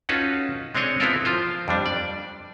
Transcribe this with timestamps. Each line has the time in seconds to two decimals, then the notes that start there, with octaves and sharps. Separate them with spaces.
0.09 C#4 D#4 F4 F#4 A4 B4
0.75 G#3 C4 D4 C#5 D#5
1.00 B3 C4 E4 F4 A4 A#4
1.25 F3 F4 C5
1.68 F2 G3 D4
1.86 D5